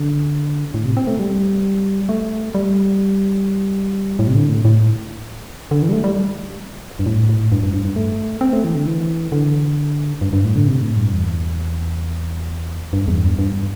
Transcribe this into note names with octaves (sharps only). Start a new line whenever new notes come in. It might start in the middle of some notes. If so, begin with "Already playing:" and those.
Already playing: D3
A2
C3
C4
A3
G3
A3
G3
A2
C3
D3
A2
A2
D3
E3
G3
A3
G3
G2
A2
A2
G2
G2
G2
G2
A3
C4
A3
E3
D3
E3
D3
G2
G2
A2
D3
C3
A2
G2
E2
G2
E2
G2
G2